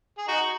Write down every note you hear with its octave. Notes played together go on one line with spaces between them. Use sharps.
G#4
D#4 F#4